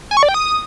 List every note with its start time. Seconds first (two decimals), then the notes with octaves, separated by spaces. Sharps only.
0.11 G#5
0.17 C#6
0.23 D5
0.29 G5
0.34 D#6